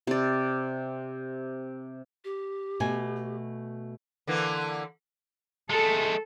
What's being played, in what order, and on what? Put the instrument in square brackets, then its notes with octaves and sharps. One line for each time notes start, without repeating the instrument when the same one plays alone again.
[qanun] C3 D5
[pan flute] G4
[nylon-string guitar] B2 A3 G#5
[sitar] D3 E3 A#3
[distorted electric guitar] G#3 A3 [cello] A4